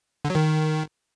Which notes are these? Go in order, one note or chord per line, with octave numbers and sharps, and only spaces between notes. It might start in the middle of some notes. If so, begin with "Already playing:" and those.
D3
F#3
D#3